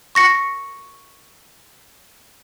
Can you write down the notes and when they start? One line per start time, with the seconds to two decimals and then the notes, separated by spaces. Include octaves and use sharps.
0.15 C#6 A#6 C#7